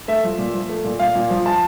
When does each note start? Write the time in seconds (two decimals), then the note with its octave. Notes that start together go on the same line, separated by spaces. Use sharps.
0.08 A3 E5
0.24 F3
0.38 A#2
0.54 F3
0.69 A3
0.84 A#2
0.99 A#2 F5
1.15 A#2
1.30 F3
1.46 F3 A5